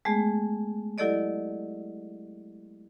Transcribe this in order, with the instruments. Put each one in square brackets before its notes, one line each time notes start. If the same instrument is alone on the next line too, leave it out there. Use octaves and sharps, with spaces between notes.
[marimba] G#3 A3 B3 G#4
F#3 E4 G4 A4 D5 D#5